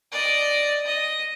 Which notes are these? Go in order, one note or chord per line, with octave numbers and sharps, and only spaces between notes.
D5 D#5
D#5